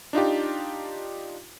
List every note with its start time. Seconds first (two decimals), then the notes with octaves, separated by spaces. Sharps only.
0.13 D4 D#4 F4 G4